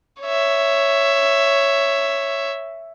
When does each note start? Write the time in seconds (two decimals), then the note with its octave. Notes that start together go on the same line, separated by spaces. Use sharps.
0.22 C#5 E5